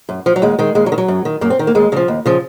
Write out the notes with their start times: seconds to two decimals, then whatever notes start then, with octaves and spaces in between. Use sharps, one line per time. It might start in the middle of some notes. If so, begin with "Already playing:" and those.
0.09 F#2
0.26 F3
0.36 F#3
0.42 D#2 G#3
0.59 D#3 G#3
0.75 D#2 G#3
0.86 F#3
0.92 D#3
0.98 F#3
1.08 F#2
1.25 D#3
1.41 F#2 A#3
1.50 C4
1.59 D#3
1.67 A#3
1.75 D#2 G#3
1.92 C#3 F#3
1.96 F3
2.08 D#2
2.26 C#3 F3